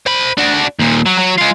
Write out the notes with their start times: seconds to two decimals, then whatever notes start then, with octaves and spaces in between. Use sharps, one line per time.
0.06 C5 B5
0.38 D4 F#4
0.79 D#2 A#2
1.06 F#3
1.18 F#3
1.38 G#3 F4